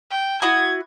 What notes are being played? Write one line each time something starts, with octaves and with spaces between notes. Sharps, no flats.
G5
E4 F#4 D#6 G#6